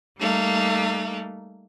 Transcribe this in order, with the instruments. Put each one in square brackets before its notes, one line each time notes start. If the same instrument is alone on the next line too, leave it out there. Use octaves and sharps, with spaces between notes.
[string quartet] G3 A3 A#3 D#4